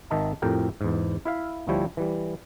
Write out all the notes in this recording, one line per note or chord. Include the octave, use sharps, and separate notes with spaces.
G#1 D#3 D#5 E5 A5
F2 A2 G4 A#4 G5
E2 G#2
E4 E5 F5
D2 F3 G3 E4 C#5 G5
E3 G3